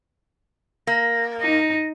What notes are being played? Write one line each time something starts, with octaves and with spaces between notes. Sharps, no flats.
A#3 A#6
D#4 A#6